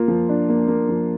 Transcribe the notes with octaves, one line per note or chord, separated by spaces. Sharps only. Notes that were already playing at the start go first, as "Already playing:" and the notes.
Already playing: A#3 F4
F3
D4
A#3
A#3
F3